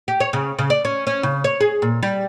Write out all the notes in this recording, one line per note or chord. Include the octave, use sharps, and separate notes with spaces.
G4
C#5
C#3
C#3
D5
C#4
C#4
C#3
C#5
G#4
A#2
G3